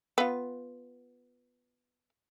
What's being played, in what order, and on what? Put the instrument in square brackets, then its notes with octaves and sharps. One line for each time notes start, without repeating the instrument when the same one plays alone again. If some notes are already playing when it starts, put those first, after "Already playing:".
[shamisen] B3 F4